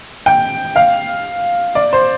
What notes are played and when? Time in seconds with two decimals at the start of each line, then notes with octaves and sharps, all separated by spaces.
0.26 G5
0.76 F5
1.75 D5
1.93 C5